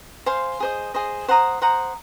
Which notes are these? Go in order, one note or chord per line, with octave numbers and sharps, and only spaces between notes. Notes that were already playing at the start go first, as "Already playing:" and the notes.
C5 F5 G#5 C6
G#4 C5 D#5
G#4 C5 D#5
C5 F#5 A#5 D#6
C5 F#5 A#5 D#6